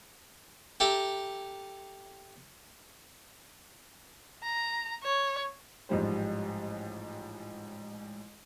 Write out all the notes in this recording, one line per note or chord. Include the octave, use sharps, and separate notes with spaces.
G4 A4 E5 A#5
A#5
C#5
A1 G#2 F3 G3 C5